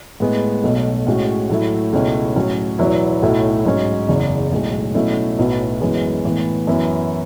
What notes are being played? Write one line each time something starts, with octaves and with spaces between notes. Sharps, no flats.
A2 G#3 B3
B1 B2 A3
A2 G#3 C#4 F#4
A2 F#3 A3 E4
C#2 B2 A3 C#4 E4
A2 F#3 C#4
E2 B2 F#3 B3 E4
B1 A2 F#3 A3 E4
G#2 F#3 C#4
F#1 E2 C#3
B1 A2 G#3
B2 F#3 A3 C#4 E4
B1 A2 F#3 B3 E4
F#2 E3 G#3 B3
A2 E3 B3
F#2 E3 B3 E4